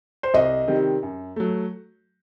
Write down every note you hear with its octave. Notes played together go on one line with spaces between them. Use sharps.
C5
C2 D#5
C3 D#3 G3 C4
F#2
F#3 A3